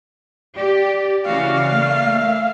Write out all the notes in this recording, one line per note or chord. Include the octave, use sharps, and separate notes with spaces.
G4 D5
C#3 E3 F#4 F5
A3 A#3
E5